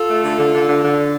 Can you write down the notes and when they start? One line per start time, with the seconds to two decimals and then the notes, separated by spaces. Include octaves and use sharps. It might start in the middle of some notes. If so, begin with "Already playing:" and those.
Already playing: F4 A4
0.08 A3
0.23 D3
0.38 D3
0.52 D3
0.67 D3
0.82 D3